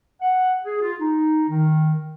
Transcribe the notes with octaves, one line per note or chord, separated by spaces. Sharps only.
F#5
G#4
F4
D#4
D#3